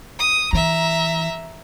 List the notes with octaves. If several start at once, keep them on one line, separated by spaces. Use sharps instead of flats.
D#6
E3 E5 A#5